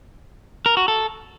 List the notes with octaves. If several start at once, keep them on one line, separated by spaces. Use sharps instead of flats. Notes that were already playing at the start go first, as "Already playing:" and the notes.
A#4
F#4
A4